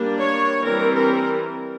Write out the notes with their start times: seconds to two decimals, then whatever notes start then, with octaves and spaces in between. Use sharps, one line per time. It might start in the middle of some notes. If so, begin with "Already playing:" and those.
Already playing: G3 A#3 D4
0.21 C#5
0.64 E3 G3 C4 A#4
0.95 A#4